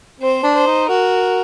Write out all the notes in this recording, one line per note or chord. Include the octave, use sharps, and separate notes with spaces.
C4 C5
D4
C5
D#4
F#4 A#4